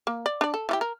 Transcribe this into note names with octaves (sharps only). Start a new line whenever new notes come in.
A#3
D5
D4 D5
A4
E3 F4 G4
A#4